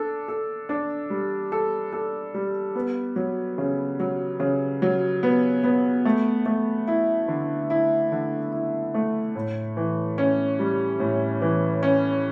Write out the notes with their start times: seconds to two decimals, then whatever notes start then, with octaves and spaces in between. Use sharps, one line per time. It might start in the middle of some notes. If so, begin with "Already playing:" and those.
Already playing: D4 A4
0.28 A4
0.69 D4
1.10 G3
1.52 A4
1.93 A4
2.34 G3
2.75 B3
3.16 F#3
3.58 C#3
4.00 F#3
4.40 C#3
4.82 F#3
5.23 B3
5.64 B3
6.05 A3
6.46 A3
6.88 E4
7.28 D3
7.70 E4
8.12 D3
8.52 E4
8.94 A3
9.35 A2
9.77 E3
10.18 C#4
10.59 G3
11.00 A2
11.41 E3
11.83 C#4